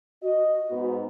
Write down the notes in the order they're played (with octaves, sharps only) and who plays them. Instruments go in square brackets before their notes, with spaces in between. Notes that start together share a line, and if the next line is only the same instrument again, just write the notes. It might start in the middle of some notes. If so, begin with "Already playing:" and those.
[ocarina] F#4 [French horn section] D#5
[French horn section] G#2 B3